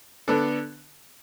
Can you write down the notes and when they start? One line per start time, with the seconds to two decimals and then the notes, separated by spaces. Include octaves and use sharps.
0.28 D3 B3 D4 A4